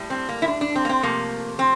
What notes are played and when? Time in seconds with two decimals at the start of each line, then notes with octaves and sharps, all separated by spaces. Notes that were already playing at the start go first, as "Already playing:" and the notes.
Already playing: A2 G3
0.10 C4
0.29 A#3
0.42 E4
0.48 D4
0.61 D4
0.75 C4
0.85 A#3
0.89 C4
1.02 C3 F3 A3 A#3
1.59 C4